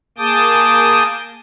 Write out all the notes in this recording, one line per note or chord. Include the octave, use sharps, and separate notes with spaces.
A#3 G#4 A5 D6 D#6 G6